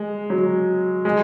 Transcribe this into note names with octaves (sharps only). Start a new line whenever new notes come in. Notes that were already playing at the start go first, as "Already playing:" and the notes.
Already playing: G#3
F#3
G#3